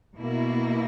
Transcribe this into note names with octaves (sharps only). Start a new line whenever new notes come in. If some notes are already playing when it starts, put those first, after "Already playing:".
B2 A#3 E4